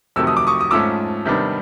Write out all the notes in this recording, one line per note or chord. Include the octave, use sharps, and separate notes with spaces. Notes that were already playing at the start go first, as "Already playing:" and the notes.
F2 C3 D#3 F#3 A3 E6
D#6
D6
C#6 D#6
D#6
G#2 F3 A3 C#4 D6 E6
C3 D#3 G3 B3 D4